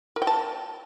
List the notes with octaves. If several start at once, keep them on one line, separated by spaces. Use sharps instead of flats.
A#4
G5
A5